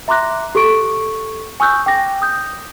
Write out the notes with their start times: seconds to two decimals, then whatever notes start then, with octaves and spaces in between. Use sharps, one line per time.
0.08 E5 A#5 C6 D6 F#6 A#6
0.55 G4 A4 C#6 D7
1.60 G#5 C#6 D#6 E6 F#6 G6
1.86 G5 D6 A#6
2.22 D#6 G6